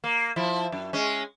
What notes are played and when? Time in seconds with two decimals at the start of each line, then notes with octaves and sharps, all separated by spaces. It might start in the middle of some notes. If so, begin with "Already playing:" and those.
0.04 A#3
0.36 F3 E4
0.72 F#2
0.93 G#3 C#4